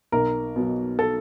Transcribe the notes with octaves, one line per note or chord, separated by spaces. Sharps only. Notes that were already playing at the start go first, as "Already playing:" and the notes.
B1 A#4
B2 F#3
A4